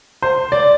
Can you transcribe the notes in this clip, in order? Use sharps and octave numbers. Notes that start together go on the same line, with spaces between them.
C5
D5